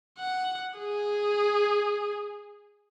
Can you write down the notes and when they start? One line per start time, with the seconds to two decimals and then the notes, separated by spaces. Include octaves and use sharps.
0.18 F#5
0.78 G#4